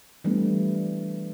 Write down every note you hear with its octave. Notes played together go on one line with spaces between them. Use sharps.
E3 G3 A3 B3 D4